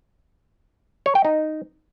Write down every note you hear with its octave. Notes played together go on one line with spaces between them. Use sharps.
C#5
G5
D#4